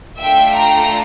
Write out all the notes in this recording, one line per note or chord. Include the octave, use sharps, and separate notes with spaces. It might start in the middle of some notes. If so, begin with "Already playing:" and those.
A3 D4 F4 A4 E5 G5
G5 A#5